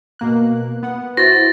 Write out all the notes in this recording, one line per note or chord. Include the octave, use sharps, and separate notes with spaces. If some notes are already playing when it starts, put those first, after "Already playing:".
B2 A#3 F#6
B3 F#5
E4 F#4 C5 A6 A#6